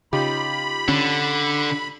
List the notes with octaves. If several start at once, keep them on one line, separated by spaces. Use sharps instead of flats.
C#3 D#4 F4 G4 B5
D3 C#4